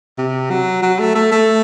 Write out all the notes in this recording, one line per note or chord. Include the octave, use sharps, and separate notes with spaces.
C3
F#3
F#3
A3
A3
A3